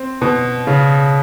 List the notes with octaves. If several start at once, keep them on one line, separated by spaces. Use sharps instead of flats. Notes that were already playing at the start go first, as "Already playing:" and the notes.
Already playing: C4
B2
C#3